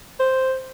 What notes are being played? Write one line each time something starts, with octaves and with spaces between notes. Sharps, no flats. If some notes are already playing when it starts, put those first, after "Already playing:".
C5